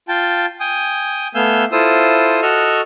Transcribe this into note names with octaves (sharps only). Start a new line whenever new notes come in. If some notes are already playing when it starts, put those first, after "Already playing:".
F4 G5 A5
G5 G#5 D#6
A3 B3 F5 G#5 E6 G6
E4 F4 A4 C5 D#6 E6
F#4 A4 D#5 C#6 E6 F6